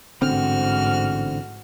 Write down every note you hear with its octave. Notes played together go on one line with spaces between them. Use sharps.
A1 G#2 D3 C4 F#4 F6